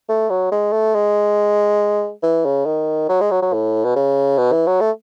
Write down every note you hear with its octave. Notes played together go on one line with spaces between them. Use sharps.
A3
F#3
G#3
A3
G#3
E3
C#3
D#3
F#3
G#3
F#3
F#3
A2
B2
C#3
B2
E3
F#3
A3